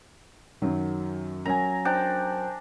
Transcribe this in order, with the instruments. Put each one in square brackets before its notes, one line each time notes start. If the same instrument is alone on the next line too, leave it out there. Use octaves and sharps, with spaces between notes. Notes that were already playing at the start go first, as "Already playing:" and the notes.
[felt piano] F#2 D#3 F#3
[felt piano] F#3 C#4 A#4 [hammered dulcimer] G#5 A#5
[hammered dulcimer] D4 [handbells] C5 G5 G6